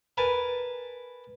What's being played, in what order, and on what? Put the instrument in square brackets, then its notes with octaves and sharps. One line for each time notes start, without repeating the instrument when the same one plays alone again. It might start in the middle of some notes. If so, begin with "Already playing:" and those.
[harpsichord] A#4 B4 G#5 A5